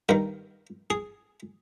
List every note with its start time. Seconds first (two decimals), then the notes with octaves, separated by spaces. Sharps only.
0.09 G2 D#3 A#4
0.90 G#4